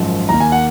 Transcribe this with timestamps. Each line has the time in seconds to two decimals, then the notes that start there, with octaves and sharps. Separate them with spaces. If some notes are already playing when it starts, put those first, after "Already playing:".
Already playing: G#1 F#2 F3
0.29 D#2 D#3 A#3 A#5
0.40 G#5
0.52 F#5